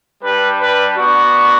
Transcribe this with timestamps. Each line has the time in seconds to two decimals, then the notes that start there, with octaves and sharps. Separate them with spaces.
0.22 G3 D4 G4 B4
0.60 B4
0.96 B3 D4 F#4